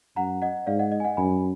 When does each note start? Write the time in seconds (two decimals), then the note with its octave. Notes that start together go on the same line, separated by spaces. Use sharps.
0.16 F#2 F#5 A#5
0.42 D#5 F#5
0.67 G#2 D5 F5
0.79 D#5 F#5
0.92 D#5
1.00 G#5
1.05 D#5 F#5
1.17 F#2 G#5 B5